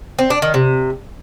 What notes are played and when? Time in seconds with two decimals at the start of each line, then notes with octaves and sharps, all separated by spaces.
0.19 C4
0.30 D4
0.42 D#3
0.54 C3